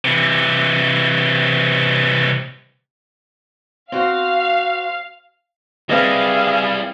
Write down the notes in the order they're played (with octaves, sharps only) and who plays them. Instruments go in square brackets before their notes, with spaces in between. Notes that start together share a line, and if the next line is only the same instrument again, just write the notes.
[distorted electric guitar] C3 E3
[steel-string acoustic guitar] C4 F#4 C5 [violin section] F5
[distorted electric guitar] G3 E4 [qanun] C4 B4 D#5 [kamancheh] G#4 F5